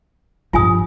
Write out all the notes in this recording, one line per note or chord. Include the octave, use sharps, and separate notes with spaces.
G2 F3 F4 G#5 D#6